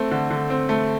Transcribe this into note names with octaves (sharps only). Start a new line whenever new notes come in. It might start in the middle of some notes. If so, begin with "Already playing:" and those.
Already playing: A3 C4
D3
D3
C4
A3